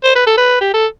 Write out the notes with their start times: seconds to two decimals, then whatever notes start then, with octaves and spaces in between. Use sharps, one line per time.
0.04 C5
0.15 B4
0.27 A4
0.37 B4
0.61 G4
0.74 A4